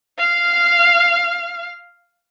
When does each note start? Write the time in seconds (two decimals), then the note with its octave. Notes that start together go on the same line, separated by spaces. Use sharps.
0.19 F5 F6